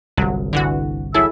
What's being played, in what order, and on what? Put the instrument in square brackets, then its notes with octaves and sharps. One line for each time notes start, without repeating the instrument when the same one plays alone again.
[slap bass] G1 C2 [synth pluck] F#3
[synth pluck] D3 E3 F#4
[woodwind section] F#3 E5 E6 [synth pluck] E4 G#4 A4